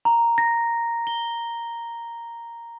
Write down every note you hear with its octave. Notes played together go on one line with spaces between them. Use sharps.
A#5
A#6
G7